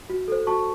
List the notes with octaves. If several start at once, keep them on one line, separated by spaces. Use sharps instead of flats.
F#4
A4 C5
F#4 A5 C#6